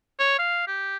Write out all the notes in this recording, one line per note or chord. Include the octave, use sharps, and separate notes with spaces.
C#5
F5
G4